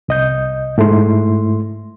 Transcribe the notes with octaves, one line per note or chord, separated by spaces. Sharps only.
C2 D#5 G6
G#2 A3 E4 C6